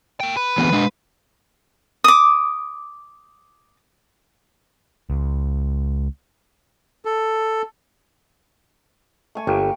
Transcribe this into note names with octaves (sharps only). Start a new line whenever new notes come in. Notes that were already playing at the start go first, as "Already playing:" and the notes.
A3 G5
B4
D3 E3 B3
G#3 D4
D6 D#6
C#2
A4
A3 G#5 C#6
G1 A#3 G4